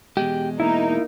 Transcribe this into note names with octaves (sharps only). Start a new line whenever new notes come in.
E2 B2 G#3 G4
A#3 D#4 E4